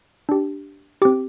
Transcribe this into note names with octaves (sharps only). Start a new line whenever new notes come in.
D4 G4
C4 G4 D6